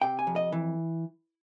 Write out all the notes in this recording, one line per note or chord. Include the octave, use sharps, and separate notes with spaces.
C3 G5
G#5
F2
D#5
E3